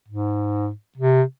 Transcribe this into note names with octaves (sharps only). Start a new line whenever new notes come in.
G#2
C3